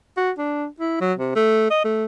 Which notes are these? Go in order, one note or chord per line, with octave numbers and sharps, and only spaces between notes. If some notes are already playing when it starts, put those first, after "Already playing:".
F#4
D4
E4
F#3
C3
A3
D#5
A3